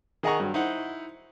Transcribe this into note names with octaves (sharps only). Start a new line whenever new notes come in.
D#3 G#4 D#5 F#5 A#5 C#6
G2 F#3
D#4 E4 C5 F#5